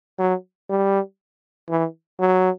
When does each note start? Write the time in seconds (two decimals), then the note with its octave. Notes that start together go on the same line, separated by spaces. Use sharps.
0.19 F#3
0.70 G3
1.70 E3
2.20 F#3